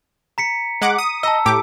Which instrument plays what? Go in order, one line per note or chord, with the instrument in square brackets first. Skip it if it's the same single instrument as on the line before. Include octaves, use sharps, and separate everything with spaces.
[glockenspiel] A#5 B6 C#7
[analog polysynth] G#3 F#5 D6
D#6
[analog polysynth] D#5 [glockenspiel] A5 A#5 E6
[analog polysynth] A2 G4 D6